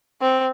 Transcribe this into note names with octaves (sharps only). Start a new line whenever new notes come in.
C4